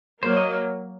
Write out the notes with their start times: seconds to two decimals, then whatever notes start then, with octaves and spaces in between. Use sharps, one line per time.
0.22 F#3 A#3 C5
0.37 D#5